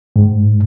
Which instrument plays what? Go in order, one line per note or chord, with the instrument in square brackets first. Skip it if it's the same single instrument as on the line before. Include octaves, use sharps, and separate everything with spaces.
[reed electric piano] G#2